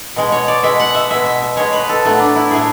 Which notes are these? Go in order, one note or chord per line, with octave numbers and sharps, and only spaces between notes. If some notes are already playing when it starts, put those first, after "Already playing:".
B2 G#3
C#5
D5
B2 G#3 E5
F#5
E5
B2 G#3 E5
E5
E5
B2 G#3 C#5
B4
A4
A2 F#3 A3 B3
D4
E4
A2 F#3 A3 G#4